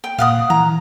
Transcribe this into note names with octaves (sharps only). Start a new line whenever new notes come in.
G5
A#2 F5 F#5 D#6
E3 A#5